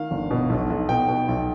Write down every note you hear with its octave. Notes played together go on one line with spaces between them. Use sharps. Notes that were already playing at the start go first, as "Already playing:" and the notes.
Already playing: D#3 F5
G1
B2
B1
B1
B2 G5
B2
B1